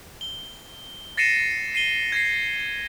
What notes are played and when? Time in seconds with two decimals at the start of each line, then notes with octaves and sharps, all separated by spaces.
0.21 G7
1.17 A6 A#6 C7 C#7 D#7 E7
1.74 C7 D#7 G7
2.12 G#6 A#6 C7